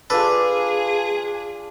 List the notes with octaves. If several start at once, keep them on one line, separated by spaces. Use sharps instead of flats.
D4 F4 G#4 A4 B4